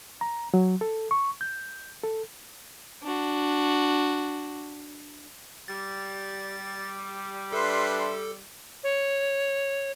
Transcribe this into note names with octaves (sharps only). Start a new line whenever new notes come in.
A#5
F#3
A4
C#6
G6
A4
D4 F#4
G3 A6
D4 A4 B4 E5 C6
C#5